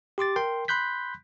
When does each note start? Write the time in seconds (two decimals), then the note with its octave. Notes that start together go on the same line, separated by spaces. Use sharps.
0.18 G4 C6 D6 A6
0.36 A#4 G5 C6
0.68 B5 C6 F#6 G6 B6